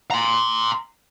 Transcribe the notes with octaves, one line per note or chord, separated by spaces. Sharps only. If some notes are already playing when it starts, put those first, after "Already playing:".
A#5 C6